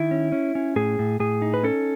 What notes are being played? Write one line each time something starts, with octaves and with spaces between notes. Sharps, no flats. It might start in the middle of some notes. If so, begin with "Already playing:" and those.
Already playing: D#3 E4
C#4
C#4
C#4
A2 G#4
A2
A2 G#4
D#4
B4
C#4 A4